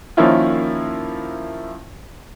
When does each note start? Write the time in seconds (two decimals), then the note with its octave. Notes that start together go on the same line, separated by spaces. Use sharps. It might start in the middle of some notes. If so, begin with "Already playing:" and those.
0.17 D#3 F3 A#3 C#4 E4 F4